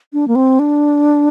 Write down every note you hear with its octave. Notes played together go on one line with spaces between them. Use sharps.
D4
A#3
C4
D4